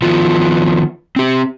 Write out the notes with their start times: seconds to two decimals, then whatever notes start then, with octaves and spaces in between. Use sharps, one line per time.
0.02 D#3 F3 B3 F4
1.16 C4 G4